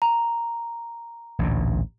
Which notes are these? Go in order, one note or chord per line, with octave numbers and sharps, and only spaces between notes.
A#5
A1 D2 A#2